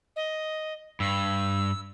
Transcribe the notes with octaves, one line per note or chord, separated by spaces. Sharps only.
D#5
G2 E6